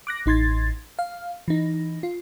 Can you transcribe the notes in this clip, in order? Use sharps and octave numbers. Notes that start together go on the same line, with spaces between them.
D6 F#6 A#6
A1 D#4 C6 G#6 A6
F5
E3 D#4
F4